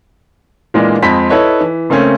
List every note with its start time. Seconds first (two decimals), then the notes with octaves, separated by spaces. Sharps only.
0.74 A#2 E3 G#3 A#3 B3 D4
1.03 F2 G#3 C4 B5 B6
1.29 E4 A4 B4 C#5 D#5
1.60 E3
1.90 C#3 A3 A#3 C4 C#4